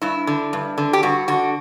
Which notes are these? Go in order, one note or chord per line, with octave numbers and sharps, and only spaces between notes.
G2 E4
D3
G2
D3
G4
G2 F#4
D3 F#4